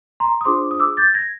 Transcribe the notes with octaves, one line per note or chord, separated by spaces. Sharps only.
A#5 C6
D#6
D4 F4 G#4 C5 C6 D6
D#6
D6 E6
G6 A6
G#6 A#6